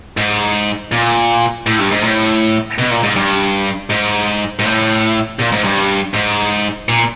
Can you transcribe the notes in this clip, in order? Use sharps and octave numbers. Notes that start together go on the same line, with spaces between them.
G#2
A#2
A2
G2
G#2
A2
B2
A#2
G#2
G2
G#2
G#2
A2
A#2
G#2
G2
G#2
A#2